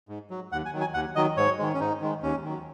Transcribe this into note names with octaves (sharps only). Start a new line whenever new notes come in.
G#2
F#3
D#2 F#5
G#5
D#3 F#3
G#5
D#2 F#5
D#3 F#3 D#5
G#2 C#5
D#3 G#3
C#4
G#2 D#4
D#3 G#3
D#2 C#4
D#3 F#3